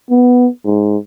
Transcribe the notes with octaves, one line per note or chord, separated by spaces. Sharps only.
B3
G#2